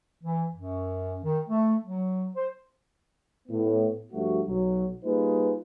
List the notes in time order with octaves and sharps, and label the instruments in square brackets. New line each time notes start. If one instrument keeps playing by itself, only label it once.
[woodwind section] E3
F#2
D#3
A3
F#3
C5
[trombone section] A2 B3
G2 F3 A3 F#4
B1 F#3
G3 A#3 D#4 F4 G#4 B4